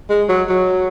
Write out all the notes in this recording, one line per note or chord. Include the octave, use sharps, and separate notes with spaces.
G#3
F#3
F#3